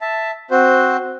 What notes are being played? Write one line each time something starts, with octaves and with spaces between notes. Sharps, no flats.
E5 A5
C4 F#4 C5